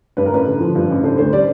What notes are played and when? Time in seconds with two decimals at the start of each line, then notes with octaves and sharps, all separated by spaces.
0.17 G2 B4
0.26 A#4
0.32 A1 B4
0.46 D3
0.60 F3
0.75 G2
0.90 A1
1.03 D3 C5
1.18 D2 C5
1.33 G3 D5